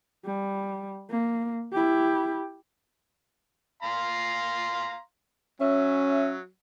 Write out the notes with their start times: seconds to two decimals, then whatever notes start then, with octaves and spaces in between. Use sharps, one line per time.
0.25 G3
1.10 A#3
1.72 E4 G4
3.82 F5 A#5 C6
5.60 F#3 C#4 E5